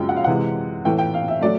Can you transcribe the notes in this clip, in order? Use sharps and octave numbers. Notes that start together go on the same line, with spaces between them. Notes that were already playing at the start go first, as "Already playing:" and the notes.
Already playing: F#2 C#3 F3 G#3 G5
F#5
F5
C3 E3 G#3 F#5
A2 E3 A3 G5
G5
F5
E5
F#3 A3 D5